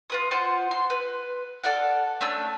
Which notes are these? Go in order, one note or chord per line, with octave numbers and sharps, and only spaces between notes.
F4 B4 D#6
F4 C5 F#5
C6
B4
A4 D5 F5 F#5
A3 C#4 D4 E6